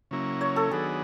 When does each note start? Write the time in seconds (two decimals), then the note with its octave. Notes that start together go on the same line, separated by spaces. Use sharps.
0.11 C#3 F#3 A#3 C#4 E4
0.41 C#5
0.56 A4
0.71 D#3 F#3 B3 D4 F#4 G#4